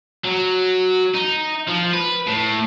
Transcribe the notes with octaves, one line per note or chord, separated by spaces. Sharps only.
F#3
D#4
F3
B4
A2